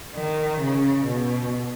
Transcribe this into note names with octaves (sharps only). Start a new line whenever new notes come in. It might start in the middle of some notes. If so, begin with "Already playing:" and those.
D#3
C#3
B2